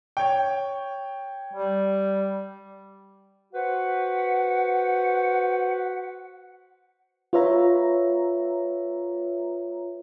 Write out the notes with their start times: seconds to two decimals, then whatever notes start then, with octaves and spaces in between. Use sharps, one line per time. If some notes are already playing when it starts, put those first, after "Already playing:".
0.17 C#5 G5
1.53 G3
3.53 F#4 B4 C5 F#5
7.33 F4 B4 C#5 E5 A#5